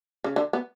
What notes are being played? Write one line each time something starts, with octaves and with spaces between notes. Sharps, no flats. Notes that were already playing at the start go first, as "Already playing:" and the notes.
C#3
D3
B3